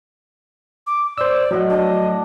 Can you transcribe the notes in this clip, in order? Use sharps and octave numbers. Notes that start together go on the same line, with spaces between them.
D6
C5 D5 E6
A2 F#3 D#5 F#5
D4 D#5